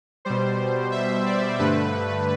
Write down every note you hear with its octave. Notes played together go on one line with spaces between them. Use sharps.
B2 G3 C5
E5
D5
G2 D3 A3 B4